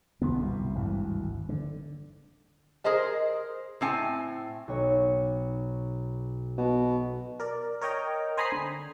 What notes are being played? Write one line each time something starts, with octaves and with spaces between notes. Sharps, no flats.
B1 D3 B3
C2 G2 B2
G#1 D2 G2 E3
D3
G#4 A#4 C5 D#5 G#5
A2 C4 G#5
B1 C#5
B2
A#4 D5
A#4 C#5 D#5 G5 A#5
C5 G#5 A#5 B5 D#6 C7
D3